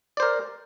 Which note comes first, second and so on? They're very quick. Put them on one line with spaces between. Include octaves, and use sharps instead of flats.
D5 C5 A#4